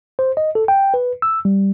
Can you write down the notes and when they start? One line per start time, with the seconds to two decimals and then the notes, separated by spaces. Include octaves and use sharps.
0.19 C5
0.37 D#5
0.55 A4
0.68 G5
0.94 B4
1.22 E6
1.45 G3